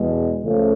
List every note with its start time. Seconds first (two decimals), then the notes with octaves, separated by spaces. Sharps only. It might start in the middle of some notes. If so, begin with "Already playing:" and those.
Already playing: E2 B2 G#3
0.43 C#2 C#3 F3 A3